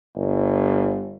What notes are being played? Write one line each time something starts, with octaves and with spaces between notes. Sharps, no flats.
G1